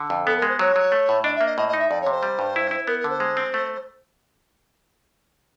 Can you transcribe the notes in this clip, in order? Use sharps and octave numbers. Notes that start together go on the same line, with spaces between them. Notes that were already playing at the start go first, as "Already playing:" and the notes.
Already playing: D3
F2
B3 A4
A#4
G#3
C5
F#3 C#5
F#3
A3
A2
D4 D#5
E5
A#3
D#5
A2 D#5
D#5
D#4
E5
F2 D5
C#5
C3
C5
G3
G2
E4
E4
B3 A#4
A#4
D3
C5
G#3
C4
A3